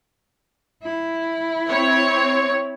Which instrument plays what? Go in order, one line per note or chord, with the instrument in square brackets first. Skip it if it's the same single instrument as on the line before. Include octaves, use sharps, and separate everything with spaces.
[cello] E4
[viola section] C4 C#5